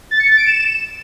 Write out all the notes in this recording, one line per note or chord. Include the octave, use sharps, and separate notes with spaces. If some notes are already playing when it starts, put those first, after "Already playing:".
A6
C#7
A6
D7
E7